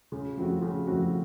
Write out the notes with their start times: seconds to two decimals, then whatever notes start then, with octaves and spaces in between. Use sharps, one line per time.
0.12 C#3
0.37 F3 A3 C4 F#4
0.62 C#3
0.87 F3 A3 C4 F#4